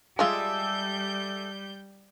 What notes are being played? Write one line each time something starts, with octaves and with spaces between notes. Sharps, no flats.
G3 G#3 F4 G#4 A4 E5 G6